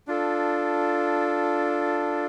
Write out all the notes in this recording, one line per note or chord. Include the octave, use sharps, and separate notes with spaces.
D4 F4 A4